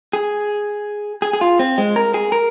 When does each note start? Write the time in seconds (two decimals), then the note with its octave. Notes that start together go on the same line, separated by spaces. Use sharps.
0.13 G#4
1.22 G#4
1.33 G#4
1.41 F4
1.59 C4
1.78 G#3
1.96 A#4
2.14 G#4
2.32 A#4